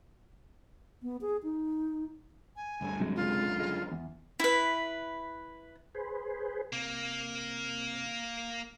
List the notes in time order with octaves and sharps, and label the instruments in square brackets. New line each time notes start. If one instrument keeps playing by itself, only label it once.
[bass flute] B3
G#4
D#4
[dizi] G#5
[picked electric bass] D2 G2 D3
[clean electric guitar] C3 F#3 G#3
[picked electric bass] C#2 F#2 D3 [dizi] F4
[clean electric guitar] G#3
E2
[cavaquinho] E4 B4
[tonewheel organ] G#4 B4 C5
[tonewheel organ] C3 [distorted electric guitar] A#3